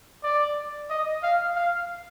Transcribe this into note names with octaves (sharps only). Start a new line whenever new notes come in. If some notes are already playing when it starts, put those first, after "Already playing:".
D5
D#5
F5
F5